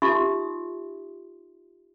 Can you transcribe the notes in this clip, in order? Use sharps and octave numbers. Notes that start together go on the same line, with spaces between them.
D#4 F4 G4 E5 C6 D#6